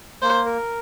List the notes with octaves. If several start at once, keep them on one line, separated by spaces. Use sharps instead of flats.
A#3 C5
A#4